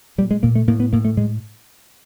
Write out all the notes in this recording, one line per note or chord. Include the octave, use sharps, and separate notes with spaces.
A#2 G3
G#3
A#2 A#3
A3
A2 A#3
B3
A2 A#3
A3
A2 G#3